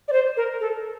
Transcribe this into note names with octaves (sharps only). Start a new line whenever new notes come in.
D5
C5
A#4
A4